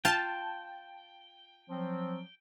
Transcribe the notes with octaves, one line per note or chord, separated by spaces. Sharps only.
F4 G5 A5
F3 F#3 C4